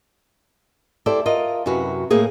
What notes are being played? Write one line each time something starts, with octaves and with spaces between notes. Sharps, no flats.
E4 G4 A4 C5 D5
F4 A#4 D#5
F#2 C3 E4 F#4 B4
A2 A#3 G#4